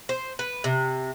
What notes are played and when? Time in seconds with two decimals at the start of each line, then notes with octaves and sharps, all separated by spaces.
0.09 C5
0.39 B4
0.64 C3